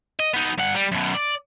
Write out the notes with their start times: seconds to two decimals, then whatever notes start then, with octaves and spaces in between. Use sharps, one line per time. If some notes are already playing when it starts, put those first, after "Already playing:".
0.20 D#5
0.34 B3 D#4
0.58 G2 F#5
0.74 G3
0.92 F#2 B2
1.14 D5